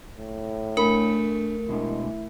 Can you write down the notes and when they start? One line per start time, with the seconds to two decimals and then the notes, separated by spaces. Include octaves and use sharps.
0.18 A2
0.77 A3 D4 A#4 G#5 B5
1.69 B2 G#3 D4 E4